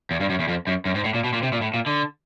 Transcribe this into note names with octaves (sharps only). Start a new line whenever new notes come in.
E2
G2
F#2
E2
F2
F#2
F#2
G#2
A2
A#2
B2
A#2
C3
A#2
A2
A#2
D3